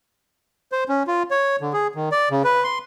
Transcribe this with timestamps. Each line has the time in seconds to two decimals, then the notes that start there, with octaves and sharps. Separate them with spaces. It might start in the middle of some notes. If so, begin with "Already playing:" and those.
0.72 C5
0.89 C#4
1.07 F4
1.31 C#5
1.61 D3
1.73 G#4
1.95 D#3
2.12 D5
2.31 C#3
2.44 B4
2.64 C6